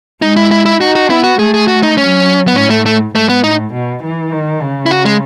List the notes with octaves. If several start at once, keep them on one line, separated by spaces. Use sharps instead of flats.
G#3 D#4
E4
E4
E4
D#4 F#4
F#4
B3 E4
F#4
A3 G#4
G#4
F#4
D#4
F#3 C#4
B3
A2 C#4
A3
A3
G#2 A3
B3
A2 D#4
B2
E3
D#3
C#3
E4
F#4
G#3